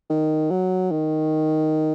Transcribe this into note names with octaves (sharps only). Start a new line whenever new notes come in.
D#3
F#3
D#3